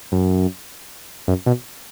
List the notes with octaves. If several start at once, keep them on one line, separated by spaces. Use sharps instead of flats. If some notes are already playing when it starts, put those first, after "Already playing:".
F#2
F#2
B2